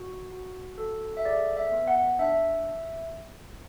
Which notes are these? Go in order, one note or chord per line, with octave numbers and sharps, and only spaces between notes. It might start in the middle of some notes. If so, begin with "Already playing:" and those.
Already playing: F#4
F#4
A4
E5
G#4 D5
E5
B3
F#5
D4 E5